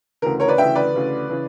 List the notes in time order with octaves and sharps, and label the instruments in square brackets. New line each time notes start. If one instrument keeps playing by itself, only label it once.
[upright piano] D2 C#3 E3 A#4
A#4 C#5
B4 D5
D2 C#3 E3 E5 G5
B4 D5
D2 C#3 E3
C#3 E3